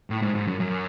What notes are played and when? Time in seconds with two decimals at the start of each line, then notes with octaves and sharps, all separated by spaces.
0.10 A2
0.22 G#2
0.35 G#2
0.47 F#2
0.60 F#2